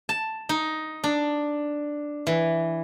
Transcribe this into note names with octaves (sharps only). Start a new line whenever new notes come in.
A5
D#4
D4
E3